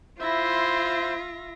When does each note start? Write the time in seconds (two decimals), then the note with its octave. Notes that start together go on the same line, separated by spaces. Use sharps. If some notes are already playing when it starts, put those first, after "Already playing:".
0.20 E4 F4 C5 E5 A#6